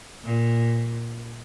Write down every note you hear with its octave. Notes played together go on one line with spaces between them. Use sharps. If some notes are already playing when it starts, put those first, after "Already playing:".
A#2